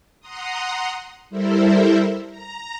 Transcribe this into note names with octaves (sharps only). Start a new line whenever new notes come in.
F#5 A#5 C6 D#6
G3 E4 A4 A#4 C5 E5
A#5